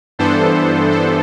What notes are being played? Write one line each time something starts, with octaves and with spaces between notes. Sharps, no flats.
G2 E3 B3 D4 A4 C5
A4 C5